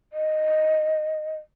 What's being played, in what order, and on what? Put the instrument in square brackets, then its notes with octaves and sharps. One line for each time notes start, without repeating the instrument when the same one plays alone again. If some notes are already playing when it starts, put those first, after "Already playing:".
[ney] D#5